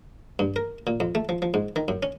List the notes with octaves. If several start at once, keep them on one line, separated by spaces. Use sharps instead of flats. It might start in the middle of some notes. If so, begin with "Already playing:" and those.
G2
A#4
A#2
F2
A3
F3
F3
G#2
D#3
F#2
C#4